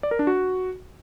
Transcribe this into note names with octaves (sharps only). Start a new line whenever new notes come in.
D5
A#4
D4
F#4